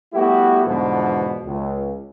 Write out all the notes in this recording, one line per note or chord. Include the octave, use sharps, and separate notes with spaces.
G3 A3 B3 E4 F#4 G4
E2 G#2 B2 D3 F3
C#2